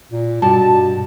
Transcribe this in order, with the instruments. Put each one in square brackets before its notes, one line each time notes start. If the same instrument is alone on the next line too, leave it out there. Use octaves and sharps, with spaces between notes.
[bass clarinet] A#2
[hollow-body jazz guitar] G2 [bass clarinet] B2 [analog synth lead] A5